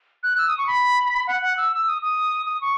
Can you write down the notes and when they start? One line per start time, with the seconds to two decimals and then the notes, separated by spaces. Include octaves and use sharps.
0.23 F#6
0.38 E6
0.48 D#6
0.58 C#6
0.67 B5
1.27 F#5
1.42 F#5
1.57 E6
1.72 E6
1.87 D#6
2.02 D#6
2.46 D#6
2.61 C#6